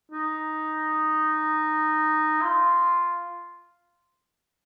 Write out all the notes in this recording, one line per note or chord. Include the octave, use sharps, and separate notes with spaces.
D#4
F4